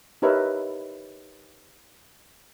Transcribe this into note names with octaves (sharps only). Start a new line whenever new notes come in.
D#4 G4 A#4 B4 C#5 E5